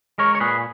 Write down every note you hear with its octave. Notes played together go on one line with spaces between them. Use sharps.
G#3 A#4 C#5
C#5
A#2 G#4 B4